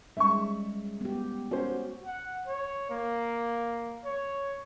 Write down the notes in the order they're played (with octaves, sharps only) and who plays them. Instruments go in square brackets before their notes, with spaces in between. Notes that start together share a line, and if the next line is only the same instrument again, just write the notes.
[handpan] G3 G#3 C#4 [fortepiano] E5 C#6
[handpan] B3 G4
[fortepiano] C#4 C5 [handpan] F#4
[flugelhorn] F#5
C#5
A#3
C#5